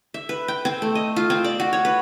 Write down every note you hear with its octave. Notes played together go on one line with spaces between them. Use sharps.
E5
B4
G5
C4
A3
D#5
F4
C4
D5
F#4
C#5
B4